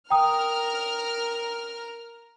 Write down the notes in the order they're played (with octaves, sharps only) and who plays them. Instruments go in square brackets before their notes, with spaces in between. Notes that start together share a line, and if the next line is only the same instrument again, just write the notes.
[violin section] A#4 F6 [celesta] G5 A#5 D#6